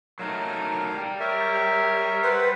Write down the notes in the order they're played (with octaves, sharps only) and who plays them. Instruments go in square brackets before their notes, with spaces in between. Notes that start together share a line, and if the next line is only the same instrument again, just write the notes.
[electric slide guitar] F#3 A3 D#4 [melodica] A#4 F5
[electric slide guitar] G3
[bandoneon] A#4 E5 [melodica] C#5
[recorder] B4 [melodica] C5 F#5